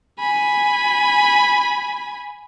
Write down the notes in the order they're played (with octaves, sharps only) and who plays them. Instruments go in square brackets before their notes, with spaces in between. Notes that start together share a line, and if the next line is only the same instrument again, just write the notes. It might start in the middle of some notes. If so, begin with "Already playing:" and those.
[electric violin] G#5 B5